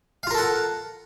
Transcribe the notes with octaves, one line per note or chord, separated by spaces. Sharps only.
F4 A4 A#4 F5 F#5